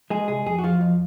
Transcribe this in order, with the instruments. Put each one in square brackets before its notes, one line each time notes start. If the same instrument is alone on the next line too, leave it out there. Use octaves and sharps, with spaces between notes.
[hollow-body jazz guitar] G#3 G#4
C2 G#4
F2 G#4
F#4
F3 F4
F2